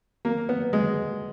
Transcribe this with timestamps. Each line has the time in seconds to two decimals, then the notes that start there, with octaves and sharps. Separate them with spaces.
0.25 A#3
0.49 B3
0.73 G#3